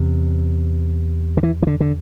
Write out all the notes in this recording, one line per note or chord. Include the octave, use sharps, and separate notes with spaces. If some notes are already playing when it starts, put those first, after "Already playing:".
Already playing: E2 C3
D3
E3
E3
D3
D3